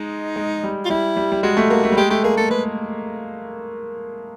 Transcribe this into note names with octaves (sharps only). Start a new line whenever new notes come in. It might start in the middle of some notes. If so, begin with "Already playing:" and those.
Already playing: G#3 D#4
G#3
G3
F4
G3 E4
G3
G3
G#3 F#4
A3
A#3 F#4
A3
G3
G#3 G4
A3 G4
A#3 G#4
A3 A4
G#3 B4